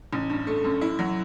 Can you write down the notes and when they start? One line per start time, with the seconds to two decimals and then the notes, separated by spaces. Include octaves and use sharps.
0.13 A1
0.30 G2
0.47 A3
0.64 F#2
0.81 E4
0.99 F#3